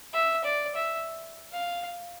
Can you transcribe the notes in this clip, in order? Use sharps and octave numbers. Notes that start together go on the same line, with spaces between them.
E5
D5
E5
F5